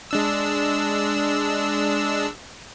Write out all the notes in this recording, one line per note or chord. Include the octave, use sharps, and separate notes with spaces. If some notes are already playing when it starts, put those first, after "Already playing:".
G#3 D4 E6